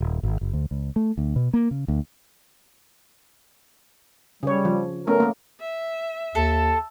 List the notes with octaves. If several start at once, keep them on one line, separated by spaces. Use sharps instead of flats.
D#1
G#1
F#1
D2
C#2
A3
D2
B2
A#3
C#3
D2
C#3 G3 C#5
F3
A3 B3 C#4 A#4
A3 A#3
E5
D#2 A4 A5